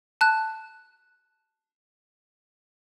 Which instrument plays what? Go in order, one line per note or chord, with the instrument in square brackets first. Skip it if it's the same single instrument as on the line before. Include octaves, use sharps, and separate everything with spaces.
[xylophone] A5 F#6